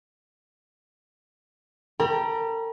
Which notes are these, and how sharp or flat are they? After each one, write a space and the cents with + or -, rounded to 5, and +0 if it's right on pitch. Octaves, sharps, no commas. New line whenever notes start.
A#4 -45 G5 +0 A#5 +45